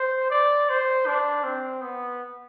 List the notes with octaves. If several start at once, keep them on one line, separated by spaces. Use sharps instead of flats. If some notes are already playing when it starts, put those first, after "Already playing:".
Already playing: C5
D5
C5
D4
C4
B3